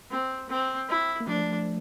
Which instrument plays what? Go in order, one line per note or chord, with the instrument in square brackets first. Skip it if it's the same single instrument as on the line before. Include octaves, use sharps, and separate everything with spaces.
[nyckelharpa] C4
C4
E4
[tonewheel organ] A#3
[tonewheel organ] F3 A3 [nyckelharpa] D4